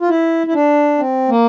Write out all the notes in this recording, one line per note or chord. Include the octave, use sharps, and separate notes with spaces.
F4
E4
E4
D4
C4
A#3